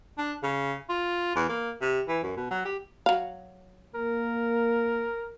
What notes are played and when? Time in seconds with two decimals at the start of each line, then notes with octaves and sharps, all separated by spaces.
0.18 D4
0.43 C#3
0.89 F4
1.36 E2
1.49 A#3
1.82 C3
2.08 E3
2.23 F#2
2.37 B2
2.51 F#3
2.65 G4
3.06 F#3 F5
3.95 A#3 A#4